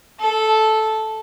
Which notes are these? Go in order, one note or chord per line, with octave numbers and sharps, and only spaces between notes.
A4